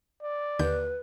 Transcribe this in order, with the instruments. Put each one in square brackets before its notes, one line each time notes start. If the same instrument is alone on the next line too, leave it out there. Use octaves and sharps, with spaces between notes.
[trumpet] D5
[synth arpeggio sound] D#2 D3 G6 [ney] B4